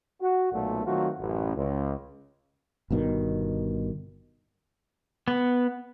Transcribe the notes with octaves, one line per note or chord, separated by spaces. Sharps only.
F#4
B1 A#2 A3
D#3 F#3 A3 C4 F4 F#4
A1 F#2
C#2
G1 G2 B2 D#3
B3